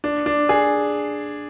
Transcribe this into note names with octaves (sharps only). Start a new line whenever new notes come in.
D4
D4
G#4